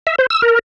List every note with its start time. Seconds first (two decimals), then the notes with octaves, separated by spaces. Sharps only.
0.07 E5
0.19 C5
0.30 E6
0.42 A#4